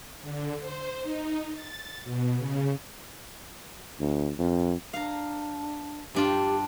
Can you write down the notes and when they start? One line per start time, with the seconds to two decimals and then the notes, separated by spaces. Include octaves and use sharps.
0.22 D3
0.60 C5
1.03 D#4
1.53 A6
2.04 B2
2.37 C#3
3.99 D2
4.39 F2
4.93 D4 F5 A#5
6.15 G2 D4 F4 G4